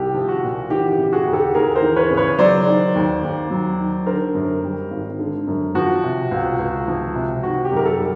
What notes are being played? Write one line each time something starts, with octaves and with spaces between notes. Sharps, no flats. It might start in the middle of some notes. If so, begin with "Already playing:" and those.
Already playing: C2 G4
F3
F#4
A#2
E3 G4
G4
C#3
F#4 G#4
D#2
G4 A4
D#2 G#4 A#4
A#4 C5
E3
B4 C#5
C#3
B4 C#5
F#3 C5 D5
D#3
D#2
D#2
F#3
D#3
D3 A#4 C5
F#2
G3
G#1
D3
F#2
F3 F#4
C3
C#2
C#2
F3
C3
D#3 F#4
G4
F#2 A#4
G4 A4
G3